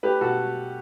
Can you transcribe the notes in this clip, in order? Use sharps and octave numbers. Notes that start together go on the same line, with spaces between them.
A3 G4 B4
B2 F#4 A4